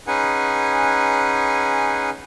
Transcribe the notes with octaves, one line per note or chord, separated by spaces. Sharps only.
C#4 D#4 G#4 B4 F#5 G#5